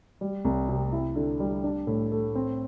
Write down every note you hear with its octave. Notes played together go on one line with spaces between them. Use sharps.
G3
C2
C3
E4
D3
G3
D4
A2
A3
C4